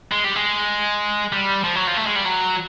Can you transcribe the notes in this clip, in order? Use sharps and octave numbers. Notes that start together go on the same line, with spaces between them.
G#3
G3
G#3
G3
F3
F#3
F3
A3
G#3
G3
F#3